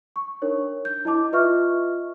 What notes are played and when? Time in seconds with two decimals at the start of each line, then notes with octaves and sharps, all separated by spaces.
0.16 C#6
0.42 D4 D#4 A#4 C#5
0.85 G6
1.05 E4 D#5 A5 D6
1.32 F4 B4 D#5 E5 C#6 F6